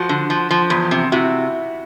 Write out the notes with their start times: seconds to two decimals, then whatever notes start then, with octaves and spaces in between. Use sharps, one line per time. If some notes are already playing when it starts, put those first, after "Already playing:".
Already playing: F3 F#4
0.09 D3
0.30 F3
0.51 F3
0.70 E2
0.91 C3
1.12 C3 E4 F#4